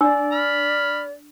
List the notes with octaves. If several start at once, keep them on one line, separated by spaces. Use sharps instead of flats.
D4 D5 E6
B5 F6